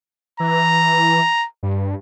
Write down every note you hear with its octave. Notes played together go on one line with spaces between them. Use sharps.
E3 A#5
G2